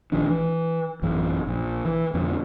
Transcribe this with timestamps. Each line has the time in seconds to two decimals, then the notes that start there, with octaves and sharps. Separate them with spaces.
0.12 A#1 D#3 F3 D4
0.29 E3
1.02 A1 F#2 E3
1.47 A#1
1.85 E3
2.14 F2 B2 D3